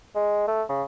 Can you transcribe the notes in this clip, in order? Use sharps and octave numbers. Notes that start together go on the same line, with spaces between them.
G#3
A3
C#3